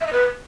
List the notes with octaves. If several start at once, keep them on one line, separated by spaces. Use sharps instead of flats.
E5
D#5
B4